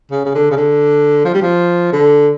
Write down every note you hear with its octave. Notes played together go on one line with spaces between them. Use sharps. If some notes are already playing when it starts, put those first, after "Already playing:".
C#3
C#3
D3
C#3
D3
F3
G3
F3
D3